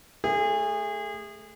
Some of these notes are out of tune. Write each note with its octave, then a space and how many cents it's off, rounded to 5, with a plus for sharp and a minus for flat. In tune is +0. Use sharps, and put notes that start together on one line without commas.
A3 +0 G#4 -30